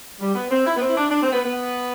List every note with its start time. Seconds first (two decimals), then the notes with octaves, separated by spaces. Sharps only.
0.21 G3
0.35 B3
0.51 C4
0.66 E4
0.76 B3
0.81 C4
0.89 E4
0.96 D4
1.11 D4
1.22 C4
1.33 B3
1.45 B3